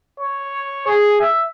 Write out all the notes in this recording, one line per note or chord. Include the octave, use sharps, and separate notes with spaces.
C#5
G#4
E5